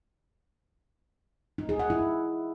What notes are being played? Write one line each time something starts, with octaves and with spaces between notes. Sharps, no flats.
D#4
G#4
F#5
E4